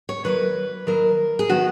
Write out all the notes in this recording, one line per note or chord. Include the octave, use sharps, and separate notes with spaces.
C#5
D#3 F#3 A#3 B4
D#3 F#3 A#3 A#4
G#4
D#3 F#3 B3 F#4